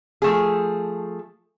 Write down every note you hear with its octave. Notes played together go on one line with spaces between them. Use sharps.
F3 A3 G#4